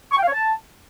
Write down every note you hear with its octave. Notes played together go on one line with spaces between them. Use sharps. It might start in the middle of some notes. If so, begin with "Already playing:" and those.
C#6
G5
F5
C#5
A5